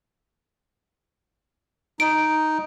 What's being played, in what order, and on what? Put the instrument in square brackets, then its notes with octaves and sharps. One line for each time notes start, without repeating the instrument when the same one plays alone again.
[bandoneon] D#4 [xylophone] D7